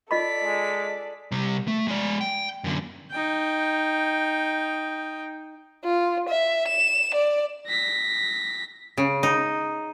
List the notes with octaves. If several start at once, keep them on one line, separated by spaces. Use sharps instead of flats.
F4 A4 D5 D#5 B5 B6
G#3
C3 G3
A3
G#3 D5
G5
F#2 D3
D#4 G5
F4
E5
E7
D5
A#6 B6
C#3
D#4